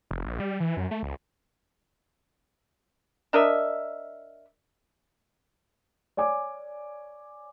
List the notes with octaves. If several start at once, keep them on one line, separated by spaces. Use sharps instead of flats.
F1
A#1
G3
E3
F#2
A3
C#2
D4 A#4 D#5 E5
C#5 D5 G#5 D6